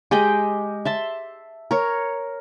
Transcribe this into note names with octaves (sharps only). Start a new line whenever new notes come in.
G#3 G4 D#5 G5
E5 A5 C6
A#4 C#5